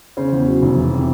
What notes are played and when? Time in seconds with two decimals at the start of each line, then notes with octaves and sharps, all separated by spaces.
0.17 C#3 C5
0.32 E2
0.47 F#3
0.62 F1
0.77 E3
0.92 C3